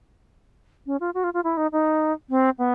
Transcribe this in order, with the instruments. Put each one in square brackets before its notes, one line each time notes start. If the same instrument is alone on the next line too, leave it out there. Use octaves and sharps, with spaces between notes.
[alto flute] C#4
F4
F#4
F4
F4
E4
D#4
D#4
C4
B3